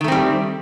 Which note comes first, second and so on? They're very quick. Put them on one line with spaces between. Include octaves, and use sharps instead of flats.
D#3 A3 C4 G3